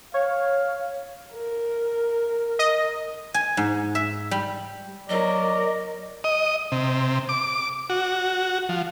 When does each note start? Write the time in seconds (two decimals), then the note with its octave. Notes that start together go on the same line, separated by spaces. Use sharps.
0.14 C#5 F5
1.34 A#4
2.59 D#5
3.34 G#5
3.57 G#2
3.95 E5
4.31 G3
5.09 F#3 A#4 D5 D#5
6.24 D#5
6.72 C3
7.29 D6
7.90 F#4
8.69 F3